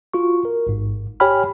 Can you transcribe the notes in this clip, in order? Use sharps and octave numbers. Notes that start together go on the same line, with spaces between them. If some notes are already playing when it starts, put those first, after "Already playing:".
F4 F#4 C#6
A#4
A1 G#2
G4 C#5 G5 G#5 B5 F6